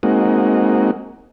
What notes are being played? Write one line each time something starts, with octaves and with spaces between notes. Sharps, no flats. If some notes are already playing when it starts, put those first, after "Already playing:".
G#3 A#3 C4 D#4 F#4